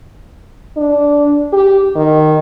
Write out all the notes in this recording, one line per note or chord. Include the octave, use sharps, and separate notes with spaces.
D4
G4
D#3